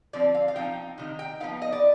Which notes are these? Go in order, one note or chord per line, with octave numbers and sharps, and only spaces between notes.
D3 F3 C4 D5
F5
F5
F3 C4 D#4 G5
C3 D#3 D#4
G5
F3 B3 D#4 F5
D#5
D5